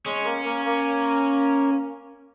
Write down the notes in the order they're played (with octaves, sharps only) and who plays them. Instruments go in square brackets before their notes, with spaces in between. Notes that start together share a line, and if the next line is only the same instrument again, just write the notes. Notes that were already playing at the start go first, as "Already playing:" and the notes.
[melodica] G#3 G#4 [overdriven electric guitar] C#4
[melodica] A#3 A#4
A#3 A#4
A#3 A#4